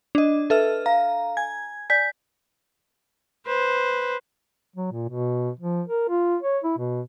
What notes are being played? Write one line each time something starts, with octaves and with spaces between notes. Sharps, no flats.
D4 D#5
A4 B4 E5 F6
F5 A#5
G#5 G#6
D5 G#5 G6 B6
B4 C5
F#3
A#2
B2
F3
A#4
F4
C#5
E4
B2